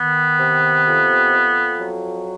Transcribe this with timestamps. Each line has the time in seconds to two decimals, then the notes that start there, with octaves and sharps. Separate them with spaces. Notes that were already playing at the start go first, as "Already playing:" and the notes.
Already playing: D#3 B3
0.40 C3
0.86 F2
1.33 F2
1.80 F#3